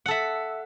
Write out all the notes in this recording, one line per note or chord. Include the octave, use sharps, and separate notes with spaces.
A4 E5 F#5